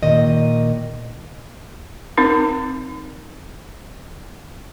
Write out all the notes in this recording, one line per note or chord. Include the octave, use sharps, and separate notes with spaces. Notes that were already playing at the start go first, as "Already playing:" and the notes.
A#2 D#3 D#5
C4 D#4 A#4